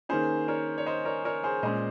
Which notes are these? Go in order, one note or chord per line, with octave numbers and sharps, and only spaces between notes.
D#3 A#3 C#4 G#4 C5
A#4 C#5
C#5
C5 D#5
A#4 C#5
A#4 C#5
G#4 C5
A#2 G#3 C#4 C5 D#5